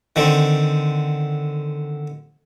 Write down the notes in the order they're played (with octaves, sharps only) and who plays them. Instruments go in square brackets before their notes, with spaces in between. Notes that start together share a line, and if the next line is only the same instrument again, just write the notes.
[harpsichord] D3 D#3 C4